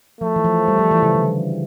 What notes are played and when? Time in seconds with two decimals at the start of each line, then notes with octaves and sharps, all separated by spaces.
0.21 F3 A3
0.36 E3
0.44 F3
0.68 G3
0.79 F3
0.91 E3
1.03 C#3
1.15 D3